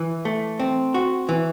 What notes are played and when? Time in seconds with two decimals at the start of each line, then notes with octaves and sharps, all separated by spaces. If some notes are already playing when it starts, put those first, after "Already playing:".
Already playing: E3
0.25 A3
0.60 C4
0.94 F#4
1.29 E3